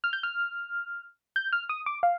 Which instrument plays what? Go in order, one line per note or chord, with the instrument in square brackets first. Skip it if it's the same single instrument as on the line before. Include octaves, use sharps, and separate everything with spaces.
[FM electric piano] F6
G6
F6
G6
F6
D#6
D6
F5